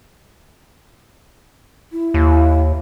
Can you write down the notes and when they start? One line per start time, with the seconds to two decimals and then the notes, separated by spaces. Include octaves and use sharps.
1.92 E4
2.14 D#2